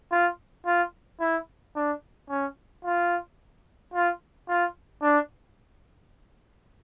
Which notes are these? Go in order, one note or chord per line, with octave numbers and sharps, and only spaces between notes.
F4
F4
E4
D4
C#4
F4
F4
F4
D4